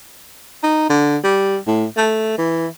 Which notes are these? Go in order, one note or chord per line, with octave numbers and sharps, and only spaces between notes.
D#4
D3
G3
A2
A3
E3